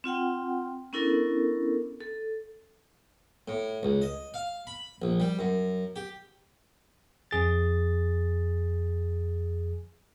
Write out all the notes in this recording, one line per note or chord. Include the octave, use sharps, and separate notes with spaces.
C4 F4 F#5 G5
B3 C#4 D4 E4 A4 A#4
A4
A2
C#2
D#5
F5
B5
A#1
G3
F#2
G4
F2 G#4 A6